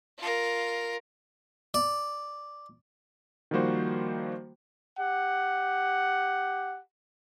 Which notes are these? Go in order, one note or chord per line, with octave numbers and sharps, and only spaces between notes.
F4 A#4
D5
D#3 F3 G3 A#3 F#4 C5
G4 F#5